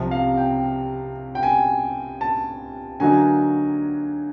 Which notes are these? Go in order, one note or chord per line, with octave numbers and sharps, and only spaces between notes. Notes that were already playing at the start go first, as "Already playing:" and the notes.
Already playing: C2 C3 F3
F5
G5
G5
G#5
A5
D3 F#3 A#3 D#4 G#5